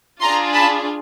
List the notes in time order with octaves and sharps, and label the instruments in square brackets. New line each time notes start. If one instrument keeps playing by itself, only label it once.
[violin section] D4 F4 G#4 A#5 C6
A5 B5